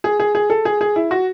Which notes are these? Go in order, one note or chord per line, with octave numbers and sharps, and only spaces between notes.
G#4
G#4
G#4
A4
G#4
G#4
E4
F#4